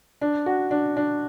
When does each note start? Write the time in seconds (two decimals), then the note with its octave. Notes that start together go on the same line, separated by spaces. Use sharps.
0.21 D4
0.46 F#4
0.71 D4
0.97 D4